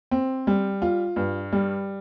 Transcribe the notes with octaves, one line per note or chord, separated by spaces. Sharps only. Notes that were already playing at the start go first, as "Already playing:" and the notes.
C4
G3
F4
G2
G3